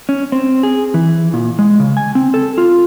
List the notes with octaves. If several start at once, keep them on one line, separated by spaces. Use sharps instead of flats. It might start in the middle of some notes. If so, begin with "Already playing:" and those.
C#4
C4
G#4
E3
A#2
G#3
C#3
G#5
C4
A4
F4